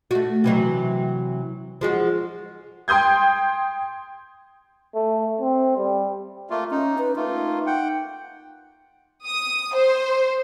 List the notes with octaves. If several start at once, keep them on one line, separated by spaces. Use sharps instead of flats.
A3 F#4
C3 E3 F#3
F3 G#3 F#4
G5 C6 D#6 G6 G#6
A3
C4
G3
A3 A#3 F4
C#4 D#4
B4
A3 A#3 D#4 F4
F#5 G5
D#6
C5